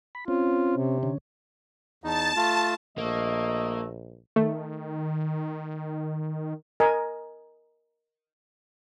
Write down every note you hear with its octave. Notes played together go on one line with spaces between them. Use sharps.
B5
C4 C#4 F4
C3
D3 C#4
E2 D#4 A5
A3 F4
A#1 A3 A#3 D#5
D#3 A3
A#4 D#5 G#5